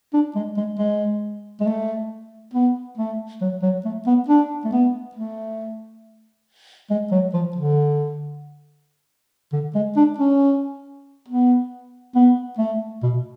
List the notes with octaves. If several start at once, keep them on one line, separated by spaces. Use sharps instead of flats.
D4
G#3
G#3
G#3
G#3
A3
B3
A3
F#3
F#3
A3
B3
D4
A3
B3
A3
G#3
F#3
F3
D3
D3
G#3
D4
C#4
B3
B3
A3
B2